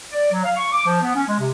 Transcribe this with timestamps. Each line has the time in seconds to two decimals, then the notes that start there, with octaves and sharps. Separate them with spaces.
0.12 D5
0.32 F#3
0.44 F5
0.57 C#6
0.72 D6
0.87 F3
1.02 B3
1.16 C#4
1.27 G#3
1.40 C3